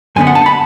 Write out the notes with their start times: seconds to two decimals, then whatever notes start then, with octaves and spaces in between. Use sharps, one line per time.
0.16 F#2 D3 G#3 B3 G#5
0.27 F#5
0.35 A5
0.46 B5